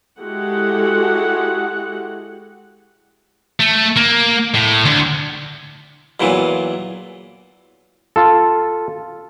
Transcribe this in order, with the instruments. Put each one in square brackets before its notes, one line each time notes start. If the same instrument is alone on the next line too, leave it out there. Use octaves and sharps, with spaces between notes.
[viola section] G#3 E4 F#4 G4 A4 F#5
[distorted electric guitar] A3
A#3
A2
D2
[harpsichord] E2 A#2 E3 F#3
[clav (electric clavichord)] F4 A4